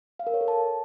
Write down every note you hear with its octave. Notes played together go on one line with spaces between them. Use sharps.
F5
A#4
C#5
A4
A5